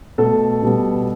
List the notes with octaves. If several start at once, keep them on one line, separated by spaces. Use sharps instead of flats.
B2 A3 A4
B2 G3 B3